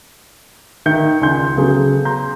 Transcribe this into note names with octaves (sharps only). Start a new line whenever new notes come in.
D#3 E5 G6 C#7
C#2 G#5 C6 G6
C#3 F#3 B3 G#4 A4
A#5 C6 G6